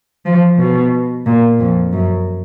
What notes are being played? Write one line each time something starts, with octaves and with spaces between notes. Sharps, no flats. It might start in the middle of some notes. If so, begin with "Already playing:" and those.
F3
B2
A#2
F2
F#2